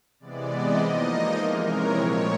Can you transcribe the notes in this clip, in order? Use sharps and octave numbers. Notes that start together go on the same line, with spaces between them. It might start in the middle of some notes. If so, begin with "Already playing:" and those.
C3 E3 G#3 B3 D5
D#5
F3 A#3 D#4
C3 E3 G#3 A#4
C#5
A#2 F3 A3